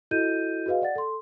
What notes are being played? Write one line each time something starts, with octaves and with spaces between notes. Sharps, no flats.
E4 F#4 A4 D#5 G6 D#7
F#4 G#4 B4 D#5 F5
D5 F#5 A6
A4 C6